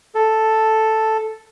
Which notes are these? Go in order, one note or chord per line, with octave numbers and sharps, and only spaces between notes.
A4